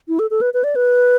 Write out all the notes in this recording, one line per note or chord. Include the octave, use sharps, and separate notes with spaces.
E4
A4
A4
B4
B4
D5
B4